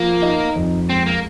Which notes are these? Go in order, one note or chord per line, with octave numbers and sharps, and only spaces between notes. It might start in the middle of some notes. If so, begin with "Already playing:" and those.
Already playing: F3 A#3
D#4
F2
G#3 C4
A#3